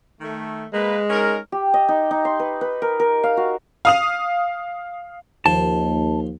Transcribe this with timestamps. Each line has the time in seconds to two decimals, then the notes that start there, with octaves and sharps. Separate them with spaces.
0.21 D#3 A3
0.73 G#3 A#3 B4
1.10 C#4 D#4 A#4
1.52 G4
1.74 D#5
1.89 D#4
2.11 D#4
2.25 C6
2.40 B4
2.61 B4
2.82 A#4
3.00 A#4
3.24 F5
3.37 F#4
3.85 F5 D#6 F7
5.46 D#2 F3 A5